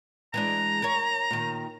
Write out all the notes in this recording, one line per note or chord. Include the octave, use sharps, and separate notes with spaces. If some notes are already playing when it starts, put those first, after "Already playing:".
E3 G#3 D4 A#5
A#4 C#5
A#2 D#3